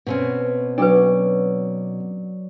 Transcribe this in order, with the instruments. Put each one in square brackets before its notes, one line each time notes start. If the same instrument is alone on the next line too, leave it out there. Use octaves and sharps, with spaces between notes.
[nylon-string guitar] B2 C4 C#4
[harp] F#3 D5 [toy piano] D4 B4